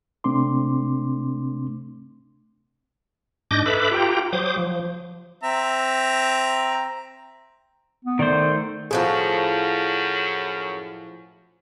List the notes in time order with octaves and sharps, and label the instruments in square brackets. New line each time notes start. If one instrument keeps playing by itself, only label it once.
[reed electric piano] C3 A3 C4 D4 C6 D6
[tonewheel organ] G#2 D4 D#5 D6 G6 A#6
A4 B4 E5 B5 D6
F4 G4 G5 A#5
F#3 C5 D6 D#6
F3
[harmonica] C4 E5 A#5
[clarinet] B3
[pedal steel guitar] D#3 A3 C5 [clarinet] D5
[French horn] F#2 [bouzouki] A2 F3 F#4 [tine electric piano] G#4